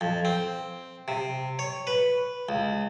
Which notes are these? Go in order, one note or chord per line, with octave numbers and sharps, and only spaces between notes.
F2
C4
C3
C#5
B4
C#2